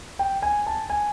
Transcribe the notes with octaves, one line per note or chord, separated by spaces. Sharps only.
G5
G#5
A5
G#5